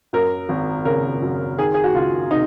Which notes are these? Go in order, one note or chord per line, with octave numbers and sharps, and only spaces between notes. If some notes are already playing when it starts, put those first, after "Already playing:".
F#2 A#4
G#1
C#3 A#4
F#2
D#3 G#4
G#4
F#4
C#2 F4
C3 D#4